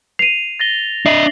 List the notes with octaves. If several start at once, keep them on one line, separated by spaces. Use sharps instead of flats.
C7 D#7 F7
A6 A#6 G7
D4 D#5 E5 C7 F#7